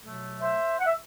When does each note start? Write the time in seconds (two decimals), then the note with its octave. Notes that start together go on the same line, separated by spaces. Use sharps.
0.02 B2 F#3 A3
0.40 C5 E5
0.79 F#5
0.86 E5